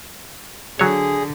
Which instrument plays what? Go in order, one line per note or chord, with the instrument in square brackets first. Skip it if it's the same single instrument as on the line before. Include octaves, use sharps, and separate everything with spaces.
[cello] D3 [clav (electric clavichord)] F#3 C#5 [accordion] G#4